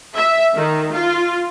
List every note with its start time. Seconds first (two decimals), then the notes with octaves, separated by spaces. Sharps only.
0.15 E5
0.56 D#3
0.93 F4